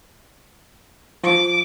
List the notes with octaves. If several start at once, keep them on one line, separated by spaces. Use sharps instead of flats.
F3 D6